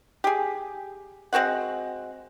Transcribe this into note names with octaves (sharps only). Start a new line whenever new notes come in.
G4 G#4
G#3 C4 F#4 F#5